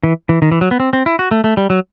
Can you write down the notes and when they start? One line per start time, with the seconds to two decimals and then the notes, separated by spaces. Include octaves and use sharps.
0.04 E3
0.29 E3
0.42 D#3
0.52 E3
0.61 F#3
0.71 B3
0.80 C4
0.93 C4
1.06 E4
1.19 F#4
1.31 A3
1.44 A3
1.57 G3
1.70 F#3